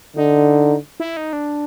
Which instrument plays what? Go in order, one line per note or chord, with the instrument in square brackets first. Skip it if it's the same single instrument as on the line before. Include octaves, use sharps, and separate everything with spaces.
[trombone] D3 [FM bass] D#4
[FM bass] E4
D#4
D4